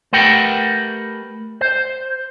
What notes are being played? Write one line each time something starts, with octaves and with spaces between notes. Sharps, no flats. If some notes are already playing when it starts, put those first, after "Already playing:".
A3 G4 A#4 B4 F#5 G5
C5